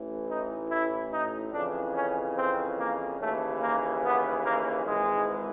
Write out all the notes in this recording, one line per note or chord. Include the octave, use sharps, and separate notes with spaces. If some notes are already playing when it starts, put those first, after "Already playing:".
Already playing: A1 A2 E3
D#4
E4
D#4
F2 C#3 E3 D4
C#4
C4
A#3
D#2 C#3 E3 A3
A#3
B3
A#3
G#1 G#2 E3 G#3